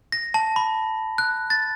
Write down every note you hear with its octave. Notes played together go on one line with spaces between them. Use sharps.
A#6
A5
B5
F#6
A6